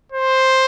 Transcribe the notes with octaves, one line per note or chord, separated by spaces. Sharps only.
C5